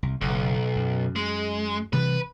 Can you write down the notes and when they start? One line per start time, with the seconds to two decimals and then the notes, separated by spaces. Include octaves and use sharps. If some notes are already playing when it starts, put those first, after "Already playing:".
0.03 C2
0.21 F#1 B1
0.76 F#2
1.16 G#3
1.93 C3 E3 G3 B4